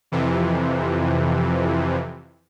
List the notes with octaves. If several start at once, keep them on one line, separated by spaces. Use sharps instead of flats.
F2 C3 E3